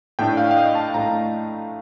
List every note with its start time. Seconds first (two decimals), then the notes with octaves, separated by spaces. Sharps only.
0.19 A2 A3 D4 G5
0.37 F5
0.51 F5
0.57 D#5
0.75 A5
0.94 A2 A3 D4 A#5